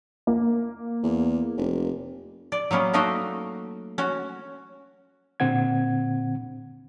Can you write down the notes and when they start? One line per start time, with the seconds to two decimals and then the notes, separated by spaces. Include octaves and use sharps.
0.27 A#3
1.03 E2
1.57 F1
2.52 D5
2.71 F#3 A#3 B3 C#4
2.94 A3 A#3 D#4 F#4 D#5
3.98 C#4 F#4
5.40 A#2 D3 C4 F#5 G#6